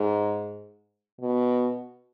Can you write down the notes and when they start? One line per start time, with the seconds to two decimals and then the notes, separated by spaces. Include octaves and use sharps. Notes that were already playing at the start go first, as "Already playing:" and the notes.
Already playing: G#2
1.21 B2